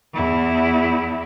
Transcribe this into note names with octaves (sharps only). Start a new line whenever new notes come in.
E2 E4